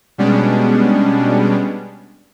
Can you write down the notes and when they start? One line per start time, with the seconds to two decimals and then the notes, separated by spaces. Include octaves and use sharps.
0.18 B2 G3 G#3 B3 C#4 D4